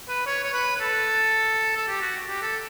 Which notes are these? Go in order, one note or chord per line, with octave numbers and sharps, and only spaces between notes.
B4
C#5
C#5
B4
B4
A4
A4
G4
F#4
G4
A4